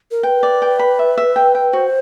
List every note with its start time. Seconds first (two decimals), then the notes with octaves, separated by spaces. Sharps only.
0.11 A#4
0.23 B4 G5
0.43 D5
0.62 G5
0.79 B5
0.99 E5
1.18 E5
1.36 G5
1.55 G5
1.73 F#4 C5